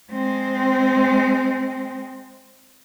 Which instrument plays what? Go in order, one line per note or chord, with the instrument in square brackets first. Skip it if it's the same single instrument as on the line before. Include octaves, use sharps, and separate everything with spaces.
[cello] G#3 C4